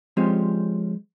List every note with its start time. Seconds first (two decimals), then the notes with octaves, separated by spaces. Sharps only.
0.17 F3 G#3 C4 C#4 F4 G4